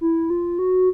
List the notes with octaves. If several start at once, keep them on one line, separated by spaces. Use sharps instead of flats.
E4
F4
F#4